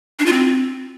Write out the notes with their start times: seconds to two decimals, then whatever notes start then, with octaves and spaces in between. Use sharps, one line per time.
0.19 D4
0.26 F4
0.33 C4